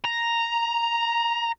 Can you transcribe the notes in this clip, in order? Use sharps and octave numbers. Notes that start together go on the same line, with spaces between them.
A#5